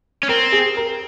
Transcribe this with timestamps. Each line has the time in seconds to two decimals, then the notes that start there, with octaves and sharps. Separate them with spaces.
0.23 C#4
0.29 C4 A#4
0.52 G#4
0.77 A#4